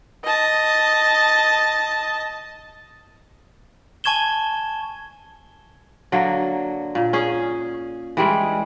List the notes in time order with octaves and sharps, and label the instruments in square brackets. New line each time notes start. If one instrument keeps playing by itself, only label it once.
[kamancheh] D#5 A5
[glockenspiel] G#5 A5 C#6 G#6 E7 G7
[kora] D3 F#3 A#3
A#2
C#4 G#4
E3 G3 G#3